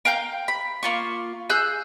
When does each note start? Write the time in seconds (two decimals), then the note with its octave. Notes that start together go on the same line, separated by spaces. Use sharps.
0.05 A#4 F5 G5 G6
0.48 B5
0.83 A#3 F4 C#6
1.50 G#4 E6 F#6 G6